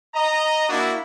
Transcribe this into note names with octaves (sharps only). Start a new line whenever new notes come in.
D#5 A#5
A#3 D4 E4 F#4